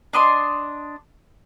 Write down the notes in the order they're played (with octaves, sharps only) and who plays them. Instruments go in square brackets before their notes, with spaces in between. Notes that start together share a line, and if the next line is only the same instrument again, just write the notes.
[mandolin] D4 D#5 C6 D6